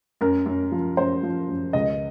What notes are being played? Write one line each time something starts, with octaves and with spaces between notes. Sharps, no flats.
F#2 A#4
F#2
F3
F#2 C5
F3
F#2
C#2 D#5